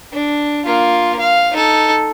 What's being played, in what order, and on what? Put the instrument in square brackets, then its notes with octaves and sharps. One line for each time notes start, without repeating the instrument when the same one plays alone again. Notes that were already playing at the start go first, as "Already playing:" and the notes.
[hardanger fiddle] D4
A#3 F4
F5
D#4 A4